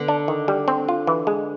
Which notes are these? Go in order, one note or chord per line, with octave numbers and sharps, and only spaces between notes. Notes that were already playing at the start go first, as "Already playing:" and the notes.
Already playing: D3 B3
D4
D#3
G3
C4
F4
E3
G#3